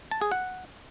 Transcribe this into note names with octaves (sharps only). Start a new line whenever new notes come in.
A5
G#4
F#5